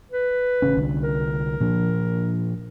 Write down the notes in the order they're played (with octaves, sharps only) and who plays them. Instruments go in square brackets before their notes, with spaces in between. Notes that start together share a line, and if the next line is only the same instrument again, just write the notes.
[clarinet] B4
[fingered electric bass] A1 C#3 C#4
C2 D3
[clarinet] A#4
[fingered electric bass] A#2 F3 D4